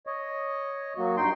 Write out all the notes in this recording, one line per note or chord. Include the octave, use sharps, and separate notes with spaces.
C#5 D#5
F#3 A#3 F#4
G2 D#4 G5 C6